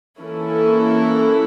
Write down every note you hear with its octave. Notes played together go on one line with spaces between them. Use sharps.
E3 A#3 C#4 E4 A4